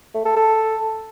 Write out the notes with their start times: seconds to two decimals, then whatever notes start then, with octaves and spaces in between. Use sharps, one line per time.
0.14 A3
0.25 A4
0.36 A4